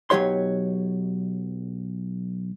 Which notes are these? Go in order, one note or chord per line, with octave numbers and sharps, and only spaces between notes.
B1 F#3 G4 C#5 C6